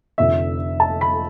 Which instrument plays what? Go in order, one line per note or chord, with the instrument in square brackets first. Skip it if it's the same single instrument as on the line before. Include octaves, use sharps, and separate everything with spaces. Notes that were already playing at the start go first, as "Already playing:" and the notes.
[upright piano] F1 F2 D3 E5
A5
B5